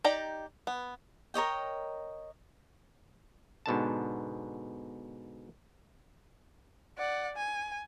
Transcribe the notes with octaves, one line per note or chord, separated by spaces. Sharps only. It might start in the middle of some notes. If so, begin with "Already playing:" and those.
D#4 G4 D5 G5 A#5
B3
A#4 C#5 D#5 G5
G#2 B2 D3 A5
D5 F#5
G#5